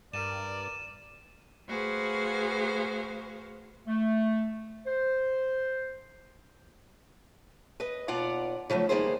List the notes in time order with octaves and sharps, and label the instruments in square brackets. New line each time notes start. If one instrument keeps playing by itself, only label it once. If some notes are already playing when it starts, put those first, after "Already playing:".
[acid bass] G2 [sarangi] A#4 [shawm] D5 [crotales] D#7 E7
[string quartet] A3 F#4 G#4 B4 C5 F5
[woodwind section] A3
C5
[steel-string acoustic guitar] B4 D#5
D#2 B2 F4 D5 F#5 A#5
C#3 F3 F#3 A3
D#3 G3 A#3 B3 G#4 C5